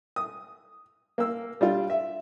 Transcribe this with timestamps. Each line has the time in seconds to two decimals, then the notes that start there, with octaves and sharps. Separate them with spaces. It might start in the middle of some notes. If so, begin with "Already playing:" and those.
0.16 D#6
1.18 A#3 E6
1.61 G3 D4 F4
1.90 E5